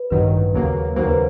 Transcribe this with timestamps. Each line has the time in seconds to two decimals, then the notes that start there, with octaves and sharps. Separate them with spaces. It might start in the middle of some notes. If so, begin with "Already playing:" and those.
Already playing: B4
0.10 A1 G2 D#3 F#3 B4
0.54 D#2 C#3 F#3 A#3
0.96 D#2 C#3 F#3 A#3 C5
1.09 B4